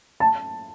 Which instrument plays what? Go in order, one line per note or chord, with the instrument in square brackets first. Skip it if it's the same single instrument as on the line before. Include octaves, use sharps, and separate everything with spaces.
[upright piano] A5